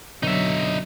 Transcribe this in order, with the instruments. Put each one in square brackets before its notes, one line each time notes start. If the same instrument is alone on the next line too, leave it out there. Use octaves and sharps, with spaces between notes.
[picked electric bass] F#1 B2 D3 [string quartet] F#3 [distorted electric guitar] D#4 E5